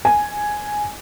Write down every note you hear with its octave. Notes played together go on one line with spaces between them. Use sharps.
G#5